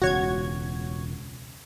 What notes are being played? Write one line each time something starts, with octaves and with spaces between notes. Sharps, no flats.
E1 C#2 F#4 C#5 G#6